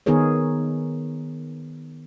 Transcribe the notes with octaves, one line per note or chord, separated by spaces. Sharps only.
D#3 B3 D#4 G#4 A#4 C#5